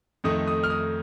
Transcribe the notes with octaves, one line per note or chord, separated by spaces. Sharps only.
F2 D#3 A3 D#4 D#6
D#6
F6
D#6